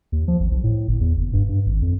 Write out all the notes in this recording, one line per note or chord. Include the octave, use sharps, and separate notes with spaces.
D#2
F3
G#1
B1
A2
G1
E2
F#1
G2
G2
G#1
F2